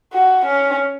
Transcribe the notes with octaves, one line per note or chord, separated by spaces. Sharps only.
F#4
C#4